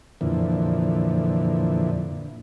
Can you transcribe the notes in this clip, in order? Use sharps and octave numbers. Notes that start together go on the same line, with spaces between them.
F2 A#2 D3 E3